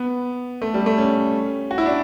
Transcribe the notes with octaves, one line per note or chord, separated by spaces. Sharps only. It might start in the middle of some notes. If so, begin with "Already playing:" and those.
Already playing: B3
A3
G3
A3
C#4
F#4
E4
D4